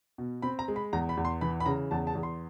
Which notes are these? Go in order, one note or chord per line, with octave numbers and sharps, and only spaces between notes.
B2
C4 B5
A#5
G#3
B5
E2 A#5
B5
E2
C6
E3 B5
B5
C#3 A#5
E2 A5
A5
E2
C6